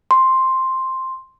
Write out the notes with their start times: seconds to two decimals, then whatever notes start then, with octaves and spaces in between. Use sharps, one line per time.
0.11 C6